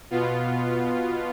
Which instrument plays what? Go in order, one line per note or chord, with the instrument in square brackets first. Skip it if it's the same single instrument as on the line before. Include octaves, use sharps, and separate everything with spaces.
[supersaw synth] B2 B3 F4